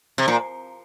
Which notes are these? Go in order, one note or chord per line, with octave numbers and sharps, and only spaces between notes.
C3
A#2